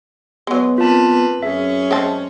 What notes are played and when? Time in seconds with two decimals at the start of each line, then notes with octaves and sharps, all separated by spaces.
0.47 F#3 G#3 B3
0.78 A#3 C4 F4 B4 A5
1.43 F#2 C#4 G#4 E5
1.91 G#3 C4 A5